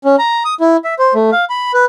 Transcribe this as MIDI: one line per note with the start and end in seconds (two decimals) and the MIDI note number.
0.04 0.16 61
0.19 0.43 82
0.45 0.54 87
0.60 0.77 64
0.85 0.94 76
0.99 1.14 72
1.15 1.30 57
1.32 1.45 77
1.50 1.72 83
1.74 1.85 71